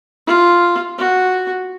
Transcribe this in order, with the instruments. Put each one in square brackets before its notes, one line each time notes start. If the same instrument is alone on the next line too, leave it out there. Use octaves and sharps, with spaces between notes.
[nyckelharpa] F4
F#4